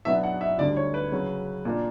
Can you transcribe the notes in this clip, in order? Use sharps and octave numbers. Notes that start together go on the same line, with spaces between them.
B2 F#3 B3 D4 E5
F#5
E5
D2 D3 G3 D5
C#5
B4
C#3 F#3 C#4
A#2 A#3 D4